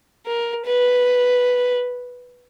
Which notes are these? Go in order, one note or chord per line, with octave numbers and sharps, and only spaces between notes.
A#4
B4